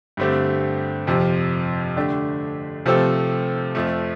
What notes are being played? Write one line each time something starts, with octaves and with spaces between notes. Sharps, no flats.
G2 D3 A3 C4 G4
F2 C3 F3
D3 A3 D4 G4
C3 F3 A3 C4 A4
F2 F3 A3